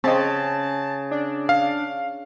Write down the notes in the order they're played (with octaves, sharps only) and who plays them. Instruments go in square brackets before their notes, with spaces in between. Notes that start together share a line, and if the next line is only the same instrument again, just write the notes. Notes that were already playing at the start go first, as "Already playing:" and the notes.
[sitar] C#3 [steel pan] C4 D#5 [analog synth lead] A5
[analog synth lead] D4
[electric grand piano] F5